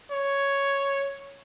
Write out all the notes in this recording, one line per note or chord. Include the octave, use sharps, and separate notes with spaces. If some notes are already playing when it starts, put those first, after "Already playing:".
C#5